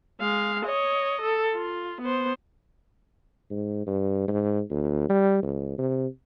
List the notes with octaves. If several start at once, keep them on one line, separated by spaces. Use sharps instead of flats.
G#3 F5
C#5 D#5
A4
F4
B3 C5
G#2
G2
G#2
D2
G3
C#2
C3